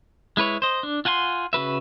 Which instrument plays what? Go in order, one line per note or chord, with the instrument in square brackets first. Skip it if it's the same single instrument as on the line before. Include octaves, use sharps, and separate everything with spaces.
[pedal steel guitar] G#3 E4 B4 C#5
C5 D#5
D4
F4 F#5 G#5 A5 C6
C#3 F#4 B4 E5